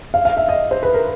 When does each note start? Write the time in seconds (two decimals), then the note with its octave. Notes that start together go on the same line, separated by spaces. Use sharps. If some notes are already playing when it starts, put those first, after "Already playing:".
0.14 F5
0.25 F5
0.37 E5
0.49 D#5
0.71 C5
0.83 B4
0.94 A#4